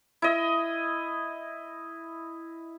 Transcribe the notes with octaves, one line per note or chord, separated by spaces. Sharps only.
E4 D#5